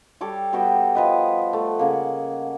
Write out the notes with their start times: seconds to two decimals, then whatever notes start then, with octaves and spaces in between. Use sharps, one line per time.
0.21 G3 A4 C#5 D6
0.53 G3 B3 F#4 G5
0.95 F3 B4 D#5
1.53 A3
1.78 C#3 A#3 F#5